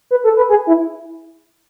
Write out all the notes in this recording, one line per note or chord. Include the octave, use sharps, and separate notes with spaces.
B4
A4
B4
G#4
E4